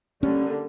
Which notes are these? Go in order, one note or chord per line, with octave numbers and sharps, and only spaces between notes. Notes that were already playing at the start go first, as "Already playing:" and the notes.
D3 G3 A#3 C#4